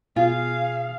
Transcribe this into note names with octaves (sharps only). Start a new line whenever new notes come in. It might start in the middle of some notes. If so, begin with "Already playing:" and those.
B2 F4 G#4 F5